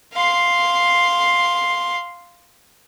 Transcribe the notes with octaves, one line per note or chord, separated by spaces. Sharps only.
F5 C6